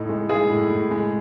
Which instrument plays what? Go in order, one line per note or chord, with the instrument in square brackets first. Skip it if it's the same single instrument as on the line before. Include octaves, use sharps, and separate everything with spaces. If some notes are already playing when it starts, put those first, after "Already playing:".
Already playing: [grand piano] A2 D#4 A4
G#3
[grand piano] G#3 [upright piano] G#4
[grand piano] A2
A2
G#3